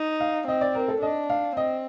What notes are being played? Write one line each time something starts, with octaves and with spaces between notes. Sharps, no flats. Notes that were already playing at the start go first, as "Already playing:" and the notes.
Already playing: D#4
F5
C4 D#5
D5
A#4
A4
D4 D#5
F5
C4 D#5